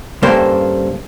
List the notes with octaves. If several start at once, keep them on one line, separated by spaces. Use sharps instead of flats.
G2 C#3 A#3 A4 C5